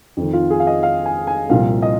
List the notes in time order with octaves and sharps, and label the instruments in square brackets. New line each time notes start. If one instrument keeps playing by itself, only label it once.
[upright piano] F2 D#3
F4
G#4
F5
D#5
F5
G#5
G#5
C2 A#2 F3 F5
D#5